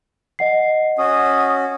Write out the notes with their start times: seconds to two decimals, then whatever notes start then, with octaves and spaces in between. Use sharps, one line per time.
0.39 D#5 F#5 C7
0.98 C#4 F#4 D#6